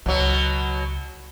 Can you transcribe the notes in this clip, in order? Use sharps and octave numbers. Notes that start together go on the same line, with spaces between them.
C#2 B2 F#3